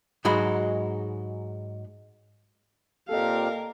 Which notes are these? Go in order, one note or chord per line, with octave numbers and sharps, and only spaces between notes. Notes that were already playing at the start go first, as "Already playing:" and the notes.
G#2 F#3 G#3 D#4 F#4 B5
A#2 A#3 C4 G4 A4 A#4 D#5 F5